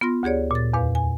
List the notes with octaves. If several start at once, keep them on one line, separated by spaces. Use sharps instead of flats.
B3 F4 C6 A#6
D2 G4 G#4 C#5 D5
A#2 A6
E2 A#2 B4 F5
G#5